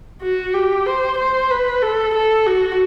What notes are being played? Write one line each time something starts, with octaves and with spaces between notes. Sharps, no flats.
F#4
G4
C5
C5
B4
A4
A4
F#4